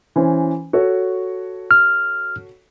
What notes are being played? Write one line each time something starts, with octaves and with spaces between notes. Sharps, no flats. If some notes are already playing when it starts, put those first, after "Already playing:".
E3 C#4 C5
F#4 A4 C#5
F6